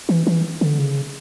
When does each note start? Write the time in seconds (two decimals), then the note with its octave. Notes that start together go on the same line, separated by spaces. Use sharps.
0.09 E3
0.27 E3
0.61 D3
0.79 C#3